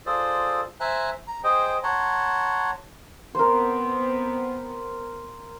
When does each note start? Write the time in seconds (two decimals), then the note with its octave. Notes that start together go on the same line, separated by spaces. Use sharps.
0.06 F4 G#4 A4 C5 D5
0.80 C5 E5 G#5 A#5 F#6
1.27 A#5
1.44 G#4 C5 D#5 G5
1.83 C#5 F#5 A5 A#5 C6
3.35 B3 C4 A#4 C5